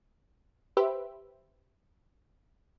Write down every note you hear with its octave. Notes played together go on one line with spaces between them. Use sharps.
G4 B4 C5 E5